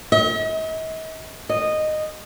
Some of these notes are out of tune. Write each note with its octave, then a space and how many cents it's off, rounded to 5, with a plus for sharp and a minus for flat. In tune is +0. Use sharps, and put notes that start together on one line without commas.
D#5 +45
D#5 -10